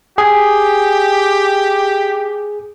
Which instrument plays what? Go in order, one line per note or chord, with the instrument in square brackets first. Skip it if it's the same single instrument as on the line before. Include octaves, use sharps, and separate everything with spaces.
[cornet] G4 [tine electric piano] G#4